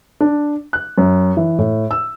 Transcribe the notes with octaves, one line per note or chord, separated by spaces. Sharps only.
D4
F#6
F#2
E3
A2
E6